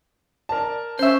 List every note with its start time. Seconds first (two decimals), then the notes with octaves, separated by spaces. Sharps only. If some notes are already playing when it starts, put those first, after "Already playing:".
0.49 A#4 D5 A5
0.99 C#4 C5 E5